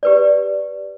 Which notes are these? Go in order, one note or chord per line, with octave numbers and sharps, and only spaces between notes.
G4 B4 D5